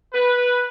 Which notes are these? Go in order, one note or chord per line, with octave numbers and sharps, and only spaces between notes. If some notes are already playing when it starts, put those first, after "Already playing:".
B4